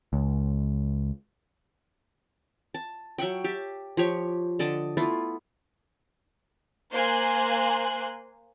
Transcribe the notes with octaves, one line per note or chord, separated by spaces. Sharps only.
C#2
A5
F#3 E5 F#5 G5
G4 E5 A5
F3 G4 C#5
D3 D5 D#5 A5
A3 B3 E4 F4
A#3 C5 G#5 C6 F#6